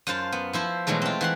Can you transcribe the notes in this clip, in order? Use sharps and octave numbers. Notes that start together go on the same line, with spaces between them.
F#2 F4 C5 A5
B3
F3 E4 C5
B2 E3 F#3 G#3 A3
C4 F4
E3 F#5 C6